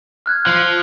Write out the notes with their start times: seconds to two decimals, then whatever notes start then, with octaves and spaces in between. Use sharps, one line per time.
0.26 F6 F#6 G#6
0.47 F3